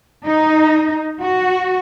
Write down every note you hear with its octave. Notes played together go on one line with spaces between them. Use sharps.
D#4
F#4